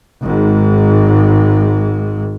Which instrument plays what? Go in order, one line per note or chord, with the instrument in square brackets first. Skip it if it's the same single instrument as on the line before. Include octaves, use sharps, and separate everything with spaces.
[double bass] G#1 G#2